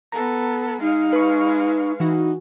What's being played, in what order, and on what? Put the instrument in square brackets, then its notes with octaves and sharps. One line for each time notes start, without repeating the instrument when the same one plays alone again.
[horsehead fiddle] B3 A4 [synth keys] A#5
[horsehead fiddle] G#3 F5 [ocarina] D#4
[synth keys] B4 C#6
[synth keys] E3 F#4 [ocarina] D#4